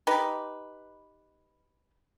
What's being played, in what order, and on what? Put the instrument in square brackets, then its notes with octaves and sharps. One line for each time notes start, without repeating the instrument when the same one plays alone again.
[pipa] D#4 G4 B4